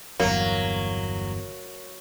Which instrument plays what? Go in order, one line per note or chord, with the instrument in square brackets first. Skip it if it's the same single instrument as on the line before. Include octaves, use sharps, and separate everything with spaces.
[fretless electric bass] G1 E2 [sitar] F#3 [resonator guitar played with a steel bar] A#3